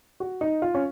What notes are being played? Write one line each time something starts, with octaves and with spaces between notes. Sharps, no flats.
F#4
D#4
F4
C#4